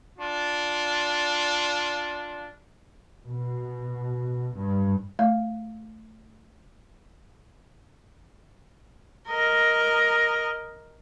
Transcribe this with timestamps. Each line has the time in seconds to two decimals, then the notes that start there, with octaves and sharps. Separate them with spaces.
0.19 D4 F4
3.22 B2
4.54 G2
5.19 A3 F5
9.29 A#4 D#5